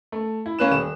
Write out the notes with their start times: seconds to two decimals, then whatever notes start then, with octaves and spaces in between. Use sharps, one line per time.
0.12 A3
0.46 E4
0.59 A#3 C#4 B4 F#6 E7
0.71 D#1 E7